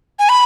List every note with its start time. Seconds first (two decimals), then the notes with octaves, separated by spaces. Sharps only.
0.19 G#5
0.29 B5